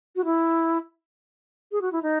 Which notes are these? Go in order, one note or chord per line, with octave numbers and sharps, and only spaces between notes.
F#4
E4
G#4
F#4
E4
D#4